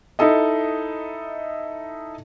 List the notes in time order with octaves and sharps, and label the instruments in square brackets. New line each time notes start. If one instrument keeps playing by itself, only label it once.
[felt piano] D#4 E4 A4 D#5